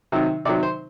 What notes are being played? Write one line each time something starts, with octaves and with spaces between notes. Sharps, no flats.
C3 D#3 F#3
C3 D#3 F#3 D5
C5